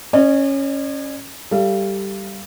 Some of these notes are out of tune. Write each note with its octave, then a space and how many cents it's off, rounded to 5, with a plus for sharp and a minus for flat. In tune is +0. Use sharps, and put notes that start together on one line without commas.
C#4 -10 D5 +45
G3 +0 A4 +20 F5 -25